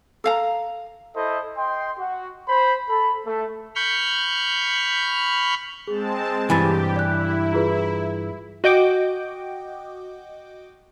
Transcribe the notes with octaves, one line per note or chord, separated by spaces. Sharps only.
A4 F5 A#5
E4 A4 C5 D#5
D#5 G5 C6
F#4
C5 B5
A4 B5
A3 A4
B5 C#6 F6 G6
G#3 C4 G#4 A5
G2 E3 G4 G#5 B5 A6
E4 D5 F#6
F4 G#4 B4
F#4 D#5 G5 D6